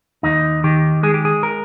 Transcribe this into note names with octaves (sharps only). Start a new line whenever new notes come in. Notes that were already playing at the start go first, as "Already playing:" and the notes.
D#2 D#4
D#3 G4
G#3 G#4
G4
G#4
A#4